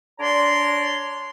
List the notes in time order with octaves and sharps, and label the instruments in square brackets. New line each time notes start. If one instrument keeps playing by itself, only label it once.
[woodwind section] D4 C#5 D5 A#5 C6